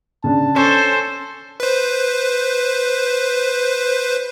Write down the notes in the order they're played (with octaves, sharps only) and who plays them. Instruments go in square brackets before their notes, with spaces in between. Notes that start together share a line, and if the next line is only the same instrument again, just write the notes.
[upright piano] C#3 D4 [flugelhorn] A5
[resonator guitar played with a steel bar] C#4 [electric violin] A4 C5 [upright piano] E7
[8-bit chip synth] B4 C5